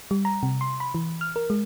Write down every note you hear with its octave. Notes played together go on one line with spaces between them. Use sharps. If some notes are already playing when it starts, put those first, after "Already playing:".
G3
A#5
C3
C6
B5
E3
F6
A#4
G#3